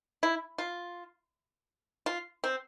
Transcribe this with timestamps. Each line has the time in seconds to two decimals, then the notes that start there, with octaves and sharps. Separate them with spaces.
0.23 E4
0.58 F4
2.06 F4
2.44 C4